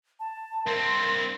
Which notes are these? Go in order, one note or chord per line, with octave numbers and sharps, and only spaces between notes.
A5
G2 C4 A#4 C6